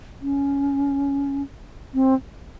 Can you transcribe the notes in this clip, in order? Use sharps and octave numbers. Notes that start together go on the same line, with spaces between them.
C#4
C4